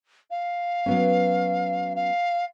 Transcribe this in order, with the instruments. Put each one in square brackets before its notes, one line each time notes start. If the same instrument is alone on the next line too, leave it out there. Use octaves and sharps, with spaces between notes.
[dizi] F5
[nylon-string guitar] F#3 B3 C#4
[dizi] F5